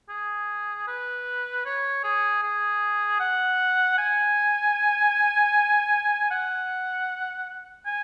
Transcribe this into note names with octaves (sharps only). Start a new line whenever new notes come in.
G#4
B4
C#5
G#4
G#4
F#5
G#5
F#5
G#5